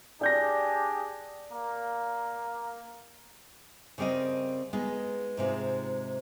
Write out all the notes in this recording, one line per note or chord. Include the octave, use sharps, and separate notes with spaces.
D4 G4 G#4 D5 G6 A#6
A#3
C#3 G3 C4 A#4 D#5
G#3 B3 D#4
G#2 C3 G#3 F4